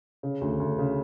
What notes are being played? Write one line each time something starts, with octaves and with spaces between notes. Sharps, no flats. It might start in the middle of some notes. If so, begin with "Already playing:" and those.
C#3
D2
D2
C#3